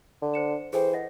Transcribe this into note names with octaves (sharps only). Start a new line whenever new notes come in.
D3
C5 C#7 E7
E3 G#4 A4 C5 G5
D#5 F#5 A#6